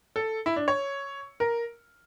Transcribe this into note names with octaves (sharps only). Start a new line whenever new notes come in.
A4
E4
D4
C#5
A#4